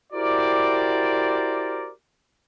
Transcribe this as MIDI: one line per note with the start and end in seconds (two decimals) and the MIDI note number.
0.13 1.90 64
0.13 1.90 66
0.13 1.90 67
0.13 1.90 70
0.13 1.90 72
0.13 1.90 74